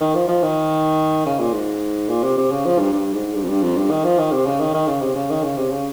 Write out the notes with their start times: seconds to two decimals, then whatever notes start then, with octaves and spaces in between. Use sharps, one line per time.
0.01 D#3
0.15 F3
0.28 F3
0.43 D#3
1.26 C#3
1.40 A#2
1.53 G#2
2.09 A#2
2.23 C3
2.37 C3
2.51 C#3
2.65 F3
2.79 G2
2.92 G2
3.14 G#2
3.34 G2
3.44 F2
3.49 G2
3.62 F2
3.77 G2
3.90 D#3
4.04 F3
4.18 D#3
4.32 C3
4.46 C#3
4.60 D#3
4.74 D#3
4.87 C#3
5.01 C3
5.15 C#3
5.30 D#3
5.43 C#3
5.57 C3
5.71 C#3